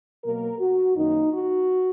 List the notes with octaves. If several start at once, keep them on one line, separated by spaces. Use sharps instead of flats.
B2 F#3 A#3 A#4
F#4
F#2 D#3 A#3 D#4
F#4